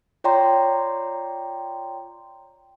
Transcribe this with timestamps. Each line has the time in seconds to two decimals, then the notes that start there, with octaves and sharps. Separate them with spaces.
0.24 F4 C#5 D5 G5 A#5 C6